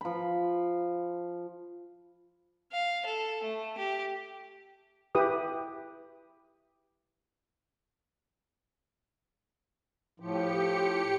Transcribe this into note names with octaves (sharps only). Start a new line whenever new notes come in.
F3 B5
F5
A4
A3
G4
E4 G4 B4 D#6
A2 F3 G4 C#7